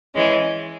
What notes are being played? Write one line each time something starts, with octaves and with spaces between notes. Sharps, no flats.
E3 G#3 C#4